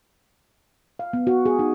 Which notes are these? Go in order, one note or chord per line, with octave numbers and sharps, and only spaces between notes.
F5
B3
F#4
G#4
D#4